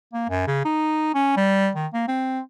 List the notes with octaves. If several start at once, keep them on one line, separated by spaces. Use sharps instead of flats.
A#3
F#2
C#3
D#4
C#4
G3
D#3
A#3
C4